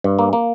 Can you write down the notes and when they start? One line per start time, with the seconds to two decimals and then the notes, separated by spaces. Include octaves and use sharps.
0.04 G2
0.19 A#3
0.33 A#3